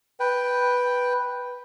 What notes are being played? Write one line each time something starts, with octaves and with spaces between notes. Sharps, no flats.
B4 G5